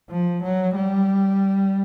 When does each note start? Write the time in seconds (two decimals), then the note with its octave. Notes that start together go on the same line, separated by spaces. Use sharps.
0.10 F3
0.43 F#3
0.75 G3